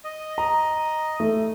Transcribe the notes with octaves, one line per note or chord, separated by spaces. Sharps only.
D#5
A#5
A3